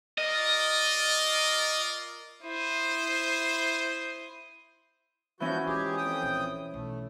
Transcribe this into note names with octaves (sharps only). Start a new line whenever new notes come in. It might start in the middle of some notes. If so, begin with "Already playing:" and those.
F4 A#4 D5 D#5
E4 C5 D#6
E3 F3 C#4 F#4 G6
G#2 F4 G4 G#4
F2 G5 D#6
A#1
B1 A3